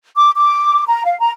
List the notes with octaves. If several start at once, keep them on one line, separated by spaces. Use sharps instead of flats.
D6
D6
A#5
F5
A#5